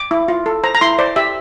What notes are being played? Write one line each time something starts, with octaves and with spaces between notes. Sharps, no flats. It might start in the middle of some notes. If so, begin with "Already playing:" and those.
Already playing: D6
E4
F4
A4
C5 A#5
A#5
E4 C6
C5 D5
G4 E5